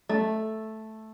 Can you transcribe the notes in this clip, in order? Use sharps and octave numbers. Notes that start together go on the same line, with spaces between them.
A3